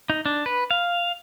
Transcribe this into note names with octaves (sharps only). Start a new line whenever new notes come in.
D#4
D4
B4
F5